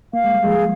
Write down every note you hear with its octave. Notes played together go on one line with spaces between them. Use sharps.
A#3 F5
G#3
G3
F3 G#3 G#4